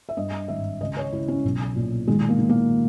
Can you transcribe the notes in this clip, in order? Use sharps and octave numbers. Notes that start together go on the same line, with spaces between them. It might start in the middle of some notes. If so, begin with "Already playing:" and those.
E5
G2 D#5
G#1 E5
C#2 D#5
C#5
C#2 E4
C#4
B1
A#2
D#3 G#3
A#3
D#3
A#3